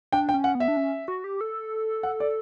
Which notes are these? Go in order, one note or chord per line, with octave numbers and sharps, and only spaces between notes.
D4 G5
G5
C#4
F#5
B3
E5
D4
C#4
F#4
G4
A4
F#5
D5